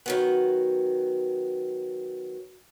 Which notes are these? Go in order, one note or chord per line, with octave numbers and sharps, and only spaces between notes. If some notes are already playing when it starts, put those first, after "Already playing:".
D#3 F#3 B3